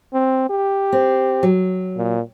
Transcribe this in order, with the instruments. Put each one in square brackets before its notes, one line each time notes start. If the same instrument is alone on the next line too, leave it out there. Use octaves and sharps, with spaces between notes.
[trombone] C4
G4
[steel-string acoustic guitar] C4
F#3
[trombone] A#2